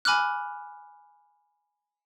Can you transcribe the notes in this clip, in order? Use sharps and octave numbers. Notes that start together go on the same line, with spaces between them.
G#5 B5 D6 F6 F#6